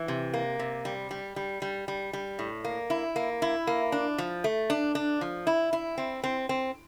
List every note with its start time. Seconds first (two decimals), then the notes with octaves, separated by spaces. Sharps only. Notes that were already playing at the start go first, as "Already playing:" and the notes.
Already playing: E3
0.08 C3
0.34 A#3
0.59 C3
0.85 G3
1.11 G3
1.36 G3
1.62 G3
1.88 G3
2.13 G3
2.39 A2
2.64 A#3
2.90 E4
3.16 A#3
3.42 E4
3.67 A#3
3.92 D4
4.18 F3
4.44 A3
4.70 D4
4.95 D4
5.21 F3
5.47 E4
5.73 E4
5.98 C4
6.24 C4
6.49 C4